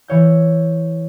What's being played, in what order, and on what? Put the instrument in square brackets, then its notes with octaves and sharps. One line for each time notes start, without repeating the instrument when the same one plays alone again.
[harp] E3 C#5 G6